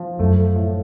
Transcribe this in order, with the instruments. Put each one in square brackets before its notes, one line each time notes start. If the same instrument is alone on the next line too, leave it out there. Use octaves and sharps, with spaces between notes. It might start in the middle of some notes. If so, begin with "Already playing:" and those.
Already playing: [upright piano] F3
[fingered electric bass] F#2 [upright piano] A3
[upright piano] A2